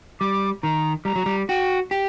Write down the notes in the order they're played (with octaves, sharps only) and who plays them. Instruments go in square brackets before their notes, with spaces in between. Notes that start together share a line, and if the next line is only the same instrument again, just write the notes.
[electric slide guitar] G3 [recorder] D6
[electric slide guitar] D#3 [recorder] A#5
[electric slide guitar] G3 [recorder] A#5
[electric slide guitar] F#3
G3
[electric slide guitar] F#4 [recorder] G5
[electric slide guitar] G4 [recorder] G5